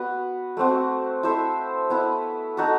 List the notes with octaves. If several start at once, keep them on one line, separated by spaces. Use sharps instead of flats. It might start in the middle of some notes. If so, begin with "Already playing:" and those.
Already playing: B3 F#4 B4
A3 C4 F#4
E4 A4 C5 E5
B3 E4 B4
D#4 F#4 A4